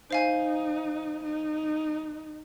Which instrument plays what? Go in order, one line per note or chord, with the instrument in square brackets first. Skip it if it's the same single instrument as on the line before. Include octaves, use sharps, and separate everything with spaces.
[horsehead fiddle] D#4 [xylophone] C5 F5 G#5
[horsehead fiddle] D#4